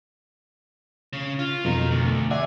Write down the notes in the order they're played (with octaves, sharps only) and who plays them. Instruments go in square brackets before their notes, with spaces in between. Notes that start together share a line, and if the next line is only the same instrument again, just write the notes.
[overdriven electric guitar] C#3
F4
[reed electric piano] F2 B2 [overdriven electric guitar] D#3 A#4
[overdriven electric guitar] D2
[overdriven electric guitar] G#4 [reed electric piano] D5 E5 F#5